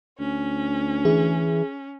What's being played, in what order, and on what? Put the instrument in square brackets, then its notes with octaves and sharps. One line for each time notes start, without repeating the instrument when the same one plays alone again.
[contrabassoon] D2 [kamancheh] C#4
[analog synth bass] E3 [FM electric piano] G#4